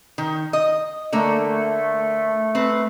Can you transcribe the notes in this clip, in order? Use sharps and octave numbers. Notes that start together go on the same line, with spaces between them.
D#3
D#5
D3 A3 A#3
C4 B4